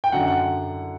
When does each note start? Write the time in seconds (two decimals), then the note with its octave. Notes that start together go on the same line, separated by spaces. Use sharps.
0.04 G5
0.12 F#2 D3 F#5
0.28 F#5